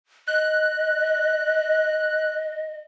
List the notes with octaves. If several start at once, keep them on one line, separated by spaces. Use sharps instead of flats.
D#5 F#6